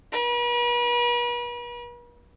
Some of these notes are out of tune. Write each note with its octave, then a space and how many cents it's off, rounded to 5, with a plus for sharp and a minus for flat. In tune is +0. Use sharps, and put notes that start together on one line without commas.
B4 -45